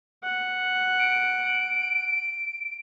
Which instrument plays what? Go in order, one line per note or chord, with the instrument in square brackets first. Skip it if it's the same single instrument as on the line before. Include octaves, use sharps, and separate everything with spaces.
[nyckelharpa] F#5
[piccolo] D7